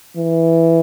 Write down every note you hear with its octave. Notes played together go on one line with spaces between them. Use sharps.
E3